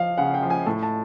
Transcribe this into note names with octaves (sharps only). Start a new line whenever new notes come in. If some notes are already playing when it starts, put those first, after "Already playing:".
Already playing: F3 F5
C#3 F#5
G5
F3
G#5
A2 A5
A5